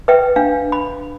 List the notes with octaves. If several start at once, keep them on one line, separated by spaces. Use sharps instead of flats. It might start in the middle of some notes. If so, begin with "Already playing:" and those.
B4 E5 G5
D4 F5
B5